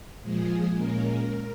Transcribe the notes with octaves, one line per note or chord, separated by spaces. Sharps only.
A#2 F3 G#3 G#4
A#2 G#3 A#3 C#4 A#4